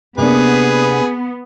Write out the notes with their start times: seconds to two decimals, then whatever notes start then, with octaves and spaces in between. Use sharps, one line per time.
0.18 C3 A#3 B3 D4 G#4 B4